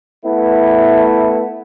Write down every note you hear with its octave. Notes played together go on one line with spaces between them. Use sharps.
A3 B3 E4